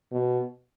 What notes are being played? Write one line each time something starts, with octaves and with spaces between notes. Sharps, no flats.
B2